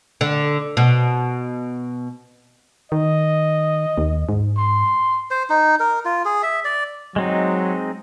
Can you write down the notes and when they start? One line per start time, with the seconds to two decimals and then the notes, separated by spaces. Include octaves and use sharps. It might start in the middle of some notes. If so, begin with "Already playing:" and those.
0.21 D3
0.77 B2
2.92 D#3 D#5
3.98 D#2
4.29 G#2
4.57 C6
5.31 C5
5.50 D#4
5.80 A#4
6.05 F4
6.25 G#4
6.43 E5
6.65 D5
7.16 F#3 G#3 C4 D#4